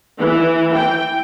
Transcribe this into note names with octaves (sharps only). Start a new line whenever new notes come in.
E3
G5